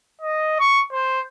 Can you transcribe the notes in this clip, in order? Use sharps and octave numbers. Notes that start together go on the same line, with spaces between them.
D#5
C#6
C5